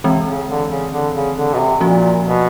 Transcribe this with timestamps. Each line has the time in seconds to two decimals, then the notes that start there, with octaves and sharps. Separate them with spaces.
0.04 C3 E3 G#3 C4
0.26 C#3
0.48 D3
0.70 C#3
0.92 D3
1.14 C#3
1.36 D3
1.54 B2
1.59 C3
1.80 A#2 F3 A#3 C#4 F#4
2.26 B2